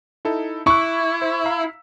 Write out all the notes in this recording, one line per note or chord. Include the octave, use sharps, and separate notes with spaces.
D#4 E4 A4
E4 B5 C#6 D6 F#6
C5
F5 A#5 E6